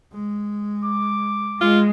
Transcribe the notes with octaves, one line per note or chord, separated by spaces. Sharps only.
G#3
D6
G#3 F4